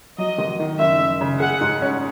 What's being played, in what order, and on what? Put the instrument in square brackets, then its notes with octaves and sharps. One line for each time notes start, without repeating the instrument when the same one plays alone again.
[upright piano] F#3 [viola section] D#5
[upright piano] G#1
D#3
[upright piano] F#1 [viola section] E5
[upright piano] F#1
C#3
[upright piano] G#4 [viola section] F#5
[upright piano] G#2
C#4